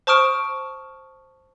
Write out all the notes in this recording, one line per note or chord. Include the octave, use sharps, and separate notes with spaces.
C5 A5 C#6 D#6 F6 D7